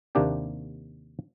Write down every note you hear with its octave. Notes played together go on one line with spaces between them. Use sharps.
D#2 C3 A#3 D4 G4 G5